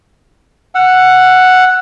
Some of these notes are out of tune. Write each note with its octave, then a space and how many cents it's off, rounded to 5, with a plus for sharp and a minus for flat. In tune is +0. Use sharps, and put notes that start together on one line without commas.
F#5 +0 E6 +35